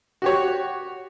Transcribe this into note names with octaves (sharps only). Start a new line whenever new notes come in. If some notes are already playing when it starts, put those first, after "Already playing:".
F#4 G4 C#5